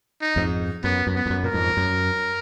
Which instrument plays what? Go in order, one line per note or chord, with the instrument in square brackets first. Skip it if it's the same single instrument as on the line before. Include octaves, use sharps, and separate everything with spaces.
[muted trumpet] D#4
[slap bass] F2 G#2
[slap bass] F#2 [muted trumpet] B3
[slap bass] F#2
[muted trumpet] B3
[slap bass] F2
F#2
[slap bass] A#2 [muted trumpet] A#4
[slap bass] F2 G#2
F#2